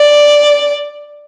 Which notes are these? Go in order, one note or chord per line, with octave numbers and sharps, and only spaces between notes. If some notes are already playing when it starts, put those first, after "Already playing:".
Already playing: D5